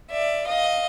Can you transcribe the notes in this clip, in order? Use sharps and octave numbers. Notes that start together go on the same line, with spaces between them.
D5 E5
D#5 F5